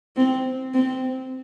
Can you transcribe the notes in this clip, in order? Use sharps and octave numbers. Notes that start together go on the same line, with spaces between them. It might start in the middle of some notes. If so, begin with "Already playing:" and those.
C4
C4